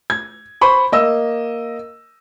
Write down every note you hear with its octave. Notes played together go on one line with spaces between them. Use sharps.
G#6
C5 B5 C#6
A#3 D#5 E6